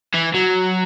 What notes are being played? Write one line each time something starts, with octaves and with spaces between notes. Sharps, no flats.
E3
F#3